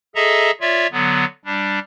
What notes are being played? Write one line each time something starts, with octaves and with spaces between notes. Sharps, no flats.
G#4 A4 D#5 E5 A#5
F4 C#5 D5 E5
D3 F#3 B3
G3 D4